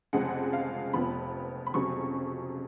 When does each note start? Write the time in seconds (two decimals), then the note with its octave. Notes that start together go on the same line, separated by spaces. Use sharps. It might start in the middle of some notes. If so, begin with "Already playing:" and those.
0.13 F1 F2 C#3 G#3 F#5
0.53 F5
0.93 F1 F2 F3 B3 B5
1.67 B5
1.74 F1 F2 C#3 F#3 C#6